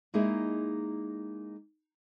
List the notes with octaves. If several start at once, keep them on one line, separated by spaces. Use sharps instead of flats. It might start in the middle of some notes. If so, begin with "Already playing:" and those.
G#3 A#3 D#4 E4 G#4 A#4